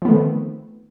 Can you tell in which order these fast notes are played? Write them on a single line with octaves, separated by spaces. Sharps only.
F3 B3 A3 D#3 C4